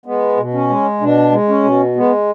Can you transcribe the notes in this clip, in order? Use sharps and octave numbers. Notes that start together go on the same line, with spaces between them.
G#3 B3
B2
C#4
G#3
B2 D4
G#3
C#4
B2
G#3 B3